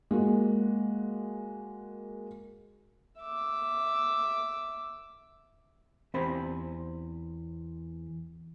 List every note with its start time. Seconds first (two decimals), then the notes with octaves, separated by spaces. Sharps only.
0.11 G#3 A#3 F#4
3.19 E5 D6
6.14 E2 C4 G4 C5 G#5 B5